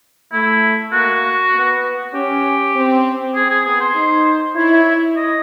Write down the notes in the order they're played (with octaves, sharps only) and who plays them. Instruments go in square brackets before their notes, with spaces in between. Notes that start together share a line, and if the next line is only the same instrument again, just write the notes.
[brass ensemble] A3 [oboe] E4
[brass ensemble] A#3 [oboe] F#4
[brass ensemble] B3
[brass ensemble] C#4 [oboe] G4
[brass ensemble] C4
[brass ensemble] C4 [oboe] G#4
[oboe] G#4
[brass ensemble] B3 [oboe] G#4
[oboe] C5
[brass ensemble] D#4
[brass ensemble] E4 [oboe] C#5
[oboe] D#5